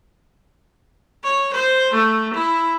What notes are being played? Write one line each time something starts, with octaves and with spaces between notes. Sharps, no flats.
C#5
C5
A3
E4